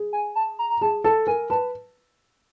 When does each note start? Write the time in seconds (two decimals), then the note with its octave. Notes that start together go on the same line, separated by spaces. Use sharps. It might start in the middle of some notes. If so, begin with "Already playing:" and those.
Already playing: G#4
0.13 G#5
0.35 A5
0.59 A#5
0.70 A#5
0.81 G#4 A5
1.04 A4 A5
1.27 A#4 G#5
1.50 B4 A5